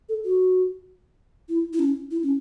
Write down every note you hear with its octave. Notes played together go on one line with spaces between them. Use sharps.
A4
F#4
E4
E4
C#4
E4
C#4